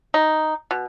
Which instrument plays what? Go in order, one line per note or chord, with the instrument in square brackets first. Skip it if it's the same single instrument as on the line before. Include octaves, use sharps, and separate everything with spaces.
[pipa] D#4
B2